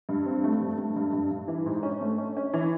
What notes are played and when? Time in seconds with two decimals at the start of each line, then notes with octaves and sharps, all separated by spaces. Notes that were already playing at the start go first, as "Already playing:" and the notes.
0.09 G2
0.26 C4
0.44 A3
0.62 G2
0.78 A3
0.96 G2
1.13 G2
1.31 G2
1.48 E3
1.66 G#2
1.83 C#4
2.01 A3
2.18 C#4
2.37 C#4
2.53 E3